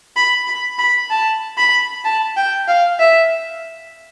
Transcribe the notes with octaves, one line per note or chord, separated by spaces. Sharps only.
B5
B5
B5
A5
B5
A5
G5
F5
E5